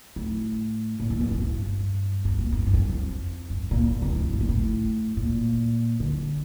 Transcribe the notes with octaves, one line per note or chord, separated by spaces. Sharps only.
A2
A#2
A#2
A#2
A2
G2
G2
A#2
G2
G2
F2
F2
G2
A#2
A#2
C3
A2
G2
A2
A#2
A2
A#2
D3